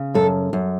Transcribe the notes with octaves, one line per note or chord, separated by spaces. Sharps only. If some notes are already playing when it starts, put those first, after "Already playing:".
Already playing: C#3
F#2 A4
F#2